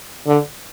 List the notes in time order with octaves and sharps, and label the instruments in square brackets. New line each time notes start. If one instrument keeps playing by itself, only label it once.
[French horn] D3